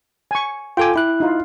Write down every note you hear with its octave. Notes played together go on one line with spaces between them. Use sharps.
G#5 C#6
F4 A4 G5 G#5 D6
E4 F#6
D#4 F4